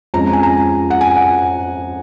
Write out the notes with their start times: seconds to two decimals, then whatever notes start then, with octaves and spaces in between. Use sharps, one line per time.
0.14 F2 F3 G#3 C#4 A#5
0.33 G#5
0.43 A#5
0.90 F#5
1.01 G#5
1.16 F#5